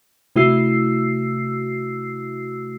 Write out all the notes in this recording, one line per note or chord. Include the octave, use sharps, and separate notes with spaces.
C3 A3 E4 F#4 E6 C7